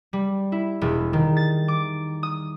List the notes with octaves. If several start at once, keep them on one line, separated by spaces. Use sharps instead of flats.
G3
E4
E1
D#3
A6
D6
D#6